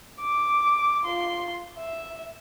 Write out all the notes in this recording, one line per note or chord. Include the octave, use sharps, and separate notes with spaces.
D6
F4 C6
E5